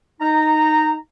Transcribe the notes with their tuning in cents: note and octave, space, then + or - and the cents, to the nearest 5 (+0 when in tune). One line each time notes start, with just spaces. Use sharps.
D#4 +0 A#5 -15